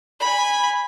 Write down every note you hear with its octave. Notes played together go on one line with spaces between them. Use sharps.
G#5 B5